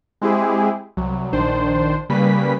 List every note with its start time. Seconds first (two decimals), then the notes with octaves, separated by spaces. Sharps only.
0.22 G#3 C4 E4 G4 G#4
0.97 C2 F#3
1.33 A#1 D#3 D4 C5
2.09 C#3 G3 A#3 B4 B6